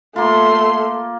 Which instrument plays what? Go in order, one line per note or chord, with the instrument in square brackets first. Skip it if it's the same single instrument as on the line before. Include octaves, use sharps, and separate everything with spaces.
[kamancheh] A3 C6 [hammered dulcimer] A#3 F4